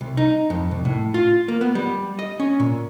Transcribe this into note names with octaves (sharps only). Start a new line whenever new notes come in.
C2
D#4
F2
C2
A2
F4
A#3
B3
G3
D#5
C#4
A#2